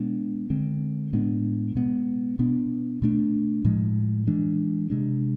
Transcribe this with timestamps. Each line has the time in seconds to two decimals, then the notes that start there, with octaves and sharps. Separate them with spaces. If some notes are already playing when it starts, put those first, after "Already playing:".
Already playing: B2 G#3 B3 D4
0.50 D3 G#3 C4
1.13 A2 G#3 B3 D4
1.75 B2 G#3 B3
2.39 B2 B3 D4
3.02 B2 A3 D4
3.65 A2 F3 G#3
4.27 E3 G#3 D4
4.90 C3 G#3 D4